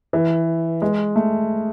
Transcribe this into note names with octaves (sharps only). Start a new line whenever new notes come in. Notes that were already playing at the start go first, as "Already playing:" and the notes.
E3
G#3
A3